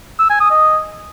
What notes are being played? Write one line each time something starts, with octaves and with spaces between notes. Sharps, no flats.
E6
G#5
D#6
D#5